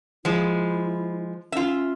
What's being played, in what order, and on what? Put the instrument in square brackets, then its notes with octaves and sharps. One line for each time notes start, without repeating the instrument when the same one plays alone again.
[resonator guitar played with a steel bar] F3 G#3 [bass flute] E4
[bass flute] C#4 [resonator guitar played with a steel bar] F4 E5